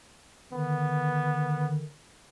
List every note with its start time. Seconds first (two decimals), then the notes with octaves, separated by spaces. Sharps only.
0.52 D3 D#3 B3